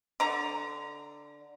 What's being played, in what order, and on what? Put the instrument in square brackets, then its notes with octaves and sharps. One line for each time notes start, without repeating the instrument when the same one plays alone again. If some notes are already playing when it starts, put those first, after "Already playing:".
[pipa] D3 A#5